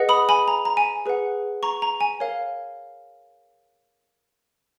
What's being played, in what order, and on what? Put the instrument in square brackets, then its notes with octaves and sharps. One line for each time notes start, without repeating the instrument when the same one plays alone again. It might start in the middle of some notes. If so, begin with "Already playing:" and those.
Already playing: [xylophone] G#4 B4 D#5 F#5
B5 D#6
G#5 B5
A#5
A#5
G#5
G#4 B4 F#5
A#5 C#6
A#5
G#5
A#4 C#5 F5